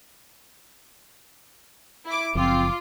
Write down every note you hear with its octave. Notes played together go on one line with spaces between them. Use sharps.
E4 D6
F#1 F3 C4 F4 D6